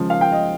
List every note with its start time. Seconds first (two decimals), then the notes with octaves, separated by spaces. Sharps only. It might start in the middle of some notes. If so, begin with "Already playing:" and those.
Already playing: C#3 F3 G#3
0.10 F5
0.21 G5
0.32 D#5